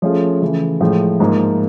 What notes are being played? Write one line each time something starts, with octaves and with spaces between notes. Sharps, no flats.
F3 A3 C#4 F4 G#4
C#3 E3 A3
A2 F3 G#3
G#2 F3 A#3